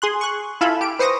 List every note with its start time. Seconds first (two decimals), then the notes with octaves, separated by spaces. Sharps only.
0.02 G#4 C6 F#6
0.21 C#6 F#6
0.61 E4 F4 A4 F5 G#5 B5
0.81 G4 D7
0.99 B4 C5 C#6 D#6 A#6